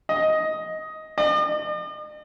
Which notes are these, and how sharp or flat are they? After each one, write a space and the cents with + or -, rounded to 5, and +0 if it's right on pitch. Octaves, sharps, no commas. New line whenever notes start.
D#5 +10
D#5 -45